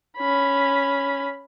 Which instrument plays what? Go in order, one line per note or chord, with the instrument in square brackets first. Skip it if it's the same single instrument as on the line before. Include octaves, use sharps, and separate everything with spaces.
[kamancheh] C#4 B5